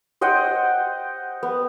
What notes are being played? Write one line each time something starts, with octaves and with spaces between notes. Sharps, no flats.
C5 D#5 F#5 G5
B3